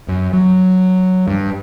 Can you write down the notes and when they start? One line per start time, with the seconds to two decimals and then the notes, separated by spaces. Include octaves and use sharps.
0.08 F#2
0.33 F#3
1.28 G2